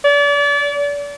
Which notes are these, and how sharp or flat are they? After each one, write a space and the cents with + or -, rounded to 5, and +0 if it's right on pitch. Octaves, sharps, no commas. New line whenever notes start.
D5 -35